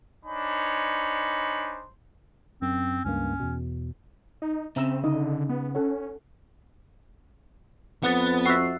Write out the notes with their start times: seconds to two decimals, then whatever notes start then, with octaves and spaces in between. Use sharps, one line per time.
0.25 D4 D#4 C5 C#5 G#5 B5
2.62 F#2 C4
3.05 C#2 G2 A#3 C#4
3.40 E2 B2
4.42 D#4
4.76 C#3 C4 E5 A#5 E6
5.04 D3 D#4 D#5
5.49 B3
5.75 C#4 A4 F#5
8.03 F2 B3 F#5 F#6 A6
8.46 F#4 E5 E6 C7